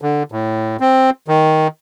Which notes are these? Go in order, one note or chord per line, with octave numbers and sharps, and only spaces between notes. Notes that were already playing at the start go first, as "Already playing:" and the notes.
D3
A2
C4
D#3